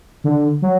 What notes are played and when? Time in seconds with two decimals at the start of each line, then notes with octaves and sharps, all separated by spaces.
0.24 D3
0.62 F#3